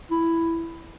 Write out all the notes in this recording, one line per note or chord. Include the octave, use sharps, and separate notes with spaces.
E4